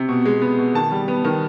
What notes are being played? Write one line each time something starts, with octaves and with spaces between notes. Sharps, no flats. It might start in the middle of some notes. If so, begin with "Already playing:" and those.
Already playing: C3
B2
G#3
B3
B2
D#3 A5
G3
B3
D#3